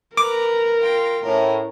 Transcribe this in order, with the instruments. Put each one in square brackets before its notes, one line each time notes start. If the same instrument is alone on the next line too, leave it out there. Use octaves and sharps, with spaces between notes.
[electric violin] A#4 [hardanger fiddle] B4 A#5 [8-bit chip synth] D6
[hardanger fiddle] F4 G5
[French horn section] A2 [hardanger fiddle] C#4 A#4